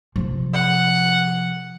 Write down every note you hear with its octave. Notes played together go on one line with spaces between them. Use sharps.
C3 F3
F#5